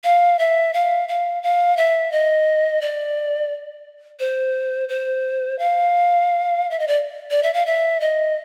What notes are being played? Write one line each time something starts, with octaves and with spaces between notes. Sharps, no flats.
F5
E5
F5
F5
F5
E5
D#5
D5
C5
C5
F5
E5
D#5
D5
D5
E5
F5
E5
D#5